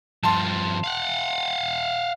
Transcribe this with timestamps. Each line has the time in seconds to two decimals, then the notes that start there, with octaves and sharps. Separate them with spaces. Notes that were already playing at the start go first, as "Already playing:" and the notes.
0.23 G2 F3 A5 C6
0.84 F5 F#5